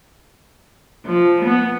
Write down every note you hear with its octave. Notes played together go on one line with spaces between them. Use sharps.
F3
B3